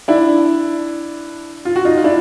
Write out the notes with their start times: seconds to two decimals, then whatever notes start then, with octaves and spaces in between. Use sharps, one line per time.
0.08 D4 E4
1.65 F4
1.76 F#4
1.85 D#4 F4
1.97 F4
2.04 D4 E4